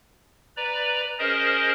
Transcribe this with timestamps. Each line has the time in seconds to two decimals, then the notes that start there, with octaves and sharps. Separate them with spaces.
0.57 B4 D5 A#5
1.19 C#4 G#4 A#4 C5 D#5